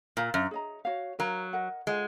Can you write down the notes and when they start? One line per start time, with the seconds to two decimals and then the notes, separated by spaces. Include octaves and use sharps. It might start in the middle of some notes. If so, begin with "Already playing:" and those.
0.17 A#2 A#4 F5 A#5
0.34 F#2
0.51 G#4 D#5 A#5
0.85 F#4 C#5 F5
1.19 F#3 A#4 F5 A#5
1.53 A#4 D#5 F#5
1.87 G#3 F4 G#4 C5 F#5